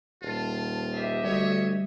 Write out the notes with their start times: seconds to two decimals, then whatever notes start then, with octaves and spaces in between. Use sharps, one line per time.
0.22 D#1 F4 A5
0.92 G4 D#5 E5
1.24 D2 G3 C#5